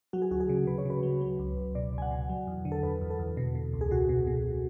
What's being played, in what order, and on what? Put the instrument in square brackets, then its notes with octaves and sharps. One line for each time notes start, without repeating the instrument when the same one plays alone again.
[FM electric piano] F#3 F#4
G#4
D2 F#4
G#4
C#3
C#3 B4
C#5
C#3 B4
F#3
F#3
C#2
C#2
B2 D5
C#2 G#5
F#5
B2
F#3
E2
D3
A4
E2 B4
E2
A4
E2
B2
B2
C#2
G#4
B2 F#4
B2
B2